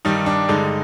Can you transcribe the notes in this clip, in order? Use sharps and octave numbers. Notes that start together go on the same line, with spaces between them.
G2 D#3 G3 D#4
D4
G2 D3 G#3 D#4